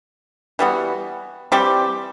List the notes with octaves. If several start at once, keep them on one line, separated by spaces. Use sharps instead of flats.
E3 G3 B3 F#4
E3 G3 C4 G4